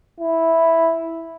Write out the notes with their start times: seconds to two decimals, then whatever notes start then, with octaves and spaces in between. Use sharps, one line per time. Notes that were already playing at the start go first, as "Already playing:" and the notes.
0.20 E4